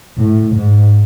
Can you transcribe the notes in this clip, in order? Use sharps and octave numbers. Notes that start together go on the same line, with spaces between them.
A2
G#2